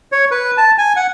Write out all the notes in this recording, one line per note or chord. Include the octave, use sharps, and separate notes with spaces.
C#5
B4
A5
G#5
F#5